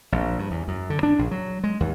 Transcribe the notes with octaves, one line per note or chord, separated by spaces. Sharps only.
A#1
G2
E2
F#2
D3
D4
A#1
F#3
G#3
D#2